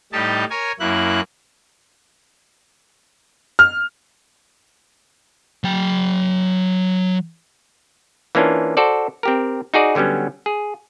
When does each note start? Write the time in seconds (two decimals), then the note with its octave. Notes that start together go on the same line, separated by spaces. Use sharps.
0.13 A2 G3 D#4 G4 A5
0.50 A#4 C#5 G#5
0.80 F#2 A#3 E4 F#6
3.59 F6
5.64 F#3 G5
8.35 E3 A#3 C#4 D4 F4
8.77 F#4 A4 C5 D5
9.23 C4 G4 A#4
9.74 D#4 F#4 G#4 D5
9.95 D3 F#3 G3 B3 C#4
10.46 G#4